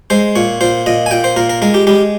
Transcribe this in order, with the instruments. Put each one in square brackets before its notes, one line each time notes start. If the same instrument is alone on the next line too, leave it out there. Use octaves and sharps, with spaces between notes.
[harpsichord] G#3 C5
A#2 C#5
A#2 C5
A#2 D#5
G#5
A#2 G5
C5
A#2 A#4
A#4
G#3 A#4
G4
G#3 G4